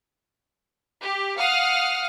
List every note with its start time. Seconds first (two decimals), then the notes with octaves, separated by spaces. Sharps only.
1.00 G4
1.37 F5 F#5 D#6 F6